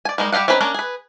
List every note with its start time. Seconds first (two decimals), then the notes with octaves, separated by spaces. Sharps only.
0.05 D5 G#5
0.18 G3 G#3 A#3 D#4
0.32 G3 G4 D#5 F5 F#5
0.48 C4 C#4 D#4 B4 B5
0.61 A#3 C#4 D4 A#4
0.74 G#4 B4